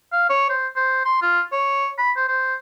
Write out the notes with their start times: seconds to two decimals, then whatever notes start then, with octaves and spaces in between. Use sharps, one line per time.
0.13 F5
0.30 C#5
0.50 C5
0.76 C5
1.05 C6
1.22 F4
1.52 C#5
1.98 B5
2.16 C5
2.28 C5